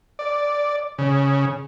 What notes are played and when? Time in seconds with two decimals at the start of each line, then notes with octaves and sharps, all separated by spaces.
0.19 D5
0.98 C#3